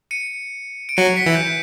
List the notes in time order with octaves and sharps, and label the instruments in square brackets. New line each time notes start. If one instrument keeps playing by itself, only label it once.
[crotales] C#7 D#7
D7
[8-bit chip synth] F#3 [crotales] C#7 D#7
[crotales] B6 C#7
[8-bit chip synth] E3
[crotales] G6